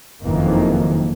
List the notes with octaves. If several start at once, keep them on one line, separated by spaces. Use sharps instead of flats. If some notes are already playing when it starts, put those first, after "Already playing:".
F#1 F2 D#3 E3 A#3